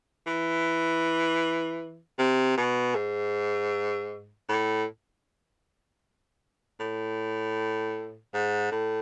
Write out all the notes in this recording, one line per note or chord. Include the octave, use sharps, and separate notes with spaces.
E3
C3
B2
G#2
A2
A2
G#2
A2